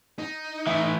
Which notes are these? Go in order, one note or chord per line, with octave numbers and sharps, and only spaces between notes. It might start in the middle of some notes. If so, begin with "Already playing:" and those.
D#4
E3 A3 E5